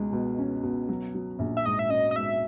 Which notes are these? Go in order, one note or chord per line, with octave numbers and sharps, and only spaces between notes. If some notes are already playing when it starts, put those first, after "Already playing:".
Already playing: C#2 B2 G#3
B2
C#4
B2
F#3
F#3
A#1
E5
G#2 D#5
E5
C#4 D#5
D#5
G#2 E5